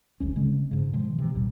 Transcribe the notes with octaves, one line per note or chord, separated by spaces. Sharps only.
D#1 G#1 D2 C#4
C#3 G#3 C4 C#4
G#2 C#3
B2 D#3 F3 G#3
C3 E3
A#1 D#2 A#2 G3